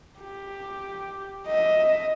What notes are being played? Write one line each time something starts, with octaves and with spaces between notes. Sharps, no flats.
G4
D#5 E5